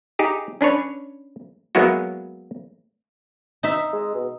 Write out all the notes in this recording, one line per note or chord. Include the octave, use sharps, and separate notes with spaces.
D#4 G4 G#4
C#4 D4 B4 C#5
F#3 G#3 A#3 B3 E4 F#4
D#4 E5
G#3
B2